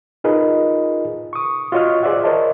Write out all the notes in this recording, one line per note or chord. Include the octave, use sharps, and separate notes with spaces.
D#4 F4 G#4 A#4 B4 D#5
C#6 D#6
F4 F#4 C#5 D#5 C#6 F6
G#4 C5 D5 E5 F#5
A#4 C5 C#5 D#5 A5